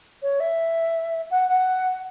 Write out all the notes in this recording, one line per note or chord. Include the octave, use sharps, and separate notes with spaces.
C#5
E5
F#5
F#5